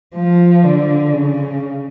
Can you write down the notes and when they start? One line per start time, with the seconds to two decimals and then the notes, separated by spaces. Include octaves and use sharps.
0.16 F3
0.64 D3
1.14 C#3